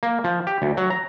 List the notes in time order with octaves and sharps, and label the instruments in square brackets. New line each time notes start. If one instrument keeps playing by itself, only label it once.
[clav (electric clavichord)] A#3
F3
G4
D2
F#3
A#5